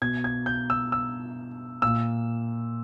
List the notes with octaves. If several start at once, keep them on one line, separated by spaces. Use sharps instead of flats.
B2 G#6
G#6
G6
E6
E6
A#2 E6